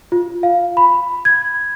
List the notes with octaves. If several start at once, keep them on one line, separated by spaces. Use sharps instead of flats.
F4
F5
B5
G#6